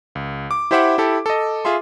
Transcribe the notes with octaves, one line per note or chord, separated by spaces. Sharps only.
C#2
D6
E4 G4 C5 E5 F#5 D6
E4 G4 A4
A4 D#5
F4 G#4 E5 C6